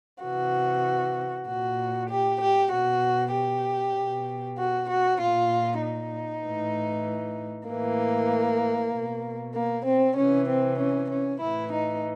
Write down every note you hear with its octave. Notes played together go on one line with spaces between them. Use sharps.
C3 E3 F#4
A#2 F#4
G4
G4
B2 F#4
G4
B2
F#4
F#4
A#2 F4
D#4
A2 E3
A2 E3 A#3
B2
A#3
C4
C3 E3 C#4
C4
C#4
C#4
A2 E3 E4
D#4